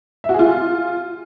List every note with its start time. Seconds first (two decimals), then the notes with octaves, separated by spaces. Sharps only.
0.24 E5
0.29 F#4
0.34 G#4
0.39 F4